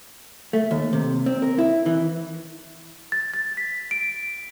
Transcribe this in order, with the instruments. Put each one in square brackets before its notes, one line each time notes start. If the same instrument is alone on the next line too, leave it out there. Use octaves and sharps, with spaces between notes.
[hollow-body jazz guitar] A3
D#2
C3
C4
A#4
E4
E3
[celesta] A6
A6
B6
D7